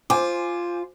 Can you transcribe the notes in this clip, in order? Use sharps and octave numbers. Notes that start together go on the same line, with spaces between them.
F4 C5 G#5 D6